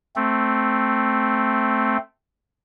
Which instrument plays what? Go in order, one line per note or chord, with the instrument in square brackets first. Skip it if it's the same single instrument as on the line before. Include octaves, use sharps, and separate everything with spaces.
[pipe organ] A3 C4